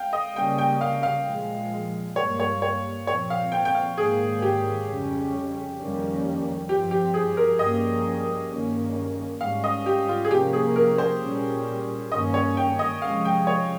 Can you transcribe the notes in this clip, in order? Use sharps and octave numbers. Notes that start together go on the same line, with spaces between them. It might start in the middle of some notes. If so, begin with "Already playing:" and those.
Already playing: F5 G5
D#5
C#3 G3 A#3 C#4 G5
G5
F5
F5
A#2 F3 G#3
G2 G3 A#3 C#5
C#5
C#5
A#2 F3 C4 C#5
F5
G5
G5
F5
G#2 D#3 A#3 G#4
G4
F2 C#3 G3 C#4
F2 D#3 G3 A#3 C#4
G2 F3 C4 G4
G4
G#4
A#4
G2 F3 A#3 C#4 D#5
G2 D#3 A#3 C#4
G#2 G3 C#4 F5
D#5
G4
F4
G#4
C3 F3 A#3 C#4 G4
G#4
A#4
C5
A#2 G3 C#4
G2 D#3 A#3 C#4 D#5
C#5
G5
D#5
C3 F3 G#3 C#4 F5
G5
C#5